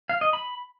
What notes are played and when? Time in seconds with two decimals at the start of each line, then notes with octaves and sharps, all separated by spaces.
0.09 F5
0.21 D#5
0.33 B5